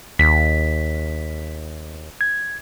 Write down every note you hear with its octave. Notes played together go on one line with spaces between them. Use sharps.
D#2 B6
G#6